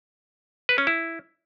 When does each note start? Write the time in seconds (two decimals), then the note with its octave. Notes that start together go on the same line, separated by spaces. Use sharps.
0.69 B4
0.78 C#4
0.87 E4